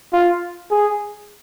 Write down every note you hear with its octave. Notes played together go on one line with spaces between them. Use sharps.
F4
G#4